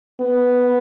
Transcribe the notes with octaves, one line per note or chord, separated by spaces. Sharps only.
B3